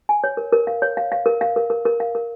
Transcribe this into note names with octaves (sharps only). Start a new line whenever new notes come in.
G#5
C#5
A#4
A#4
F5
C#5
F5
F5
A#4
F5
A#4
A#4
A#4
F5
A#4